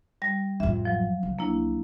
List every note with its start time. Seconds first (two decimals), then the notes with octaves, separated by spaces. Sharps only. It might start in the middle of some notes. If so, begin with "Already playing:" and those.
0.22 G3 A#6
0.60 A1 F2 E5
0.85 F3 F#3
1.23 C2
1.39 A#3 D4 E4